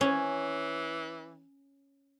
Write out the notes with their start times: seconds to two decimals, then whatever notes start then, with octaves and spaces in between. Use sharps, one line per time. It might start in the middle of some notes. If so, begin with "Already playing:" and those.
0.01 E3 C#4